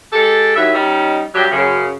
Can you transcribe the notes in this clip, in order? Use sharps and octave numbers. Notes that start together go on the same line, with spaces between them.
G#3 G4 A4
D#2 F#3 E4 E5
G3 C#4 D#4
G2 F#3 G3 G4
F#2 C#3